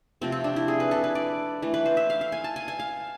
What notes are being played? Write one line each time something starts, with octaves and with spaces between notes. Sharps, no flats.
C3 F3 A3 C4
C4
D4
E4
G#4
B4
A4
B4
D5
E3 A3
B4
C5
E5
F5
F5
G#5
A5
G#5
G#5
F5